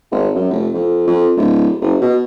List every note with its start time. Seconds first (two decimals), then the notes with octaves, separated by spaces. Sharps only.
0.11 G#1
0.35 F#2
0.51 F1
0.73 F2
1.07 F2
1.36 D1
1.81 F#1
2.01 B2